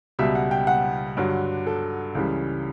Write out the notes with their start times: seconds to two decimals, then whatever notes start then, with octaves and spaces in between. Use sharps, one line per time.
0.19 C#2 B2 G3 E5
0.35 F#5
0.51 G5
0.67 F#5
1.17 G2 D3 F#3
1.67 A4
2.15 C#2 C#3 E3 G3